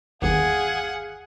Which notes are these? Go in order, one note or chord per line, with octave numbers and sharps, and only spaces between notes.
G1 D#2 G#4 F5 F#5